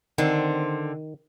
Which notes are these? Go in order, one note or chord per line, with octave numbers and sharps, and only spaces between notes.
D3 D#3 C4